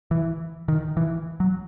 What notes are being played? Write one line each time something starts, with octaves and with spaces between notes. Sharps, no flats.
E3
D#3
E3
F#3